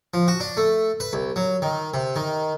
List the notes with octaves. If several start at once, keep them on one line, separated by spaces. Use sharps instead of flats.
F3
F#4
D4
A3
B4
C2
F#3
D#3
C3
D#3